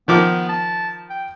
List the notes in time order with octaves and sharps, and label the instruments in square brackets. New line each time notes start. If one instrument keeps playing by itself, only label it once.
[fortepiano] D#3 F3 D6 [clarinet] B3
[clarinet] A5
G5